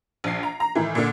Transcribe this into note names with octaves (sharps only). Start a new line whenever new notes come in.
A#1 C7
A#5
A#5
A2 D#3 E3
A#2 D3